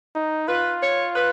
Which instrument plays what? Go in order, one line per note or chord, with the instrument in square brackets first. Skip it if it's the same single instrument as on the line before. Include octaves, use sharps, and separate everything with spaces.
[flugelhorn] D#4
[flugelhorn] F4 [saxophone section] B4
[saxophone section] C#5
B4